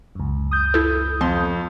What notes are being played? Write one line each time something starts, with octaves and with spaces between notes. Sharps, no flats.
C#2 F#2
D#6 G6
E4 A4
F2 C6